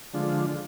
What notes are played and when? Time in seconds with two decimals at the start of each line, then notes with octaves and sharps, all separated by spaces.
0.13 D3 F3 G#3 D4 F4